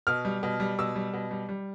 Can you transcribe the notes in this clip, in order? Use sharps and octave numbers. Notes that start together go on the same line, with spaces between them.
B2 F6
G3
B2
G3
B2 E6
G3
B2
G3
G3